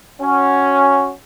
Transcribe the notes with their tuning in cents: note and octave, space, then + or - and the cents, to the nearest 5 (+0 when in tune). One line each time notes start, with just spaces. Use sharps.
C#4 +0 F#4 +0